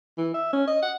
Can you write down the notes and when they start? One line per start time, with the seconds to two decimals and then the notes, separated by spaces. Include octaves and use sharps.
0.18 E3
0.34 E5
0.53 C#4
0.67 D#5
0.82 F#5